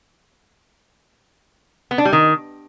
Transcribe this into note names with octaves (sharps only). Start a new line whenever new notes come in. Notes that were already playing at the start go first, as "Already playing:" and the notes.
B3
D4
G3
D#3